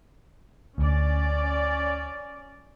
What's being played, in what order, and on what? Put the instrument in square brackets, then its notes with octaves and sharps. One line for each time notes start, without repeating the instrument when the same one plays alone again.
[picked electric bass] D2 [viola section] C#4 D5